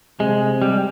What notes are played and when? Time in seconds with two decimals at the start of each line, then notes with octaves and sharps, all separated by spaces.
0.20 C3 G#3
0.62 G3